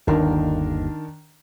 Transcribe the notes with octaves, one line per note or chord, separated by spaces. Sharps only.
G1 D#2 D#3 D4 A#4